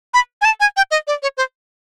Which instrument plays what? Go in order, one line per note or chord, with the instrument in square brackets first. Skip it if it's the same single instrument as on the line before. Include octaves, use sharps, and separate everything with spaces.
[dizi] B5
G#5
A5
G#5
G5
D#5
D5
C#5
C5